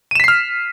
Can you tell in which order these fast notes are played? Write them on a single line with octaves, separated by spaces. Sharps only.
D#7 E7 B6 C7 F6